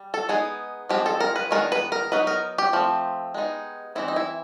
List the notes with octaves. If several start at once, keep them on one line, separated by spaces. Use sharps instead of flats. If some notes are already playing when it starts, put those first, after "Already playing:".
Already playing: G3
A4
G#3 B3 D#4 G#4
F3 G#3 C4 G4
A4
A#4
B4
D#3 G#3 B3 D4 A#4
B4
A#4
F#3 B3 D#4 B4
A#4
G4
F3 A3 C4
G#3 B3 D#4
E3 G3 C4 D#4 E4
D#4
E4